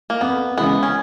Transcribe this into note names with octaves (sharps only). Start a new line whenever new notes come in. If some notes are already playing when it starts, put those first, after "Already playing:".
A#3
F2 B3
C#3 E3 G#3 B3
C#4